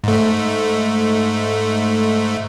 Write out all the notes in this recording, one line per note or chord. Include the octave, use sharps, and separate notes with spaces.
G#2 A3